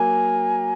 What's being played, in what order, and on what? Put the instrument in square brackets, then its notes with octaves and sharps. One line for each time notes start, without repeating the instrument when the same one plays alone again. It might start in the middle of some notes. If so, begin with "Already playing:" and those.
Already playing: [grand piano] F#3 A#3 [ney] G#5